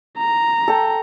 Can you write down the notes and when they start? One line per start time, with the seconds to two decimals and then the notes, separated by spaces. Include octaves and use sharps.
0.18 A#5
0.68 A4 G5